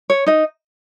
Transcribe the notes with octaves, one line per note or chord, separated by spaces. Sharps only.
C#5
D#4 D#5